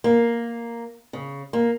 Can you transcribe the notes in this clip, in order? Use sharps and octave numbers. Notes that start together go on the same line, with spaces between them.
A#3
C#3
A#3